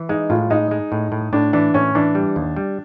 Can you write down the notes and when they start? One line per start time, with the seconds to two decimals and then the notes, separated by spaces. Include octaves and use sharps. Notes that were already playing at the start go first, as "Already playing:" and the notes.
Already playing: E3
0.09 G#3 D#4
0.30 A2 F4
0.50 G#3 D#4
0.71 G#3
0.92 A2
1.12 A2
1.33 A2 D4
1.53 E3 D4
1.74 A2 C#4
1.95 E3 D4
2.15 G3
2.36 D#2
2.57 G3